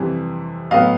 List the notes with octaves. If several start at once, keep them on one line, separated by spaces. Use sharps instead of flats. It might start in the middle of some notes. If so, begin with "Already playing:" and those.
Already playing: F2 C3 E3 G3
A2 F#3 B3 D#5 F5